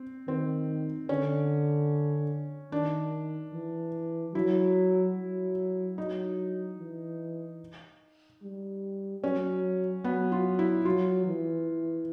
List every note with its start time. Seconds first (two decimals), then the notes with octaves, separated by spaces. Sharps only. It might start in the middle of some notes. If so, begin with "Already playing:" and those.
Already playing: C4
0.28 D#3 C4
1.09 D3 C#4
2.72 D#3 D4
3.53 E3
4.34 F#3 E4
5.16 F#3
5.98 F#3 D#4
6.79 E3
8.42 G3
9.23 F#3 C#4
10.04 F#3 B3
10.32 F4
10.59 E4
10.85 F#3 F4
11.26 E3